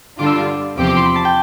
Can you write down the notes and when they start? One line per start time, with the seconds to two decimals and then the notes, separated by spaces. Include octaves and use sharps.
0.19 G2 D3 G3 D4 F4 D6
0.26 E6
0.34 D6
0.77 E2 C3 F3 C4 G4 D6
0.87 D6
0.96 C6
1.05 B5
1.16 A5
1.25 G5